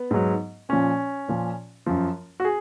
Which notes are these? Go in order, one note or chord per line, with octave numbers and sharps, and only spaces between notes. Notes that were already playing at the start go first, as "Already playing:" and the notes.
Already playing: B3
G#2 F#3
A#2 F3 C#4
A#2 F3
F#2 F3
F#4
G#4